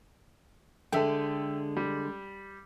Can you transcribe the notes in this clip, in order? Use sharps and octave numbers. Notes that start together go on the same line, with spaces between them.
D3 G#3 A4 E5 G5
G3